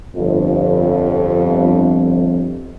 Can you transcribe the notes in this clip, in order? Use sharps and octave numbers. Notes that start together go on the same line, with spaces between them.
G1 F2